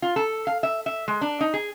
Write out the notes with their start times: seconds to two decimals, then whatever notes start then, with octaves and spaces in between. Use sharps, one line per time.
0.02 F4
0.16 A4
0.47 F5
0.63 E5
0.86 E5
1.08 G#3
1.21 D4
1.41 D#4
1.54 G#4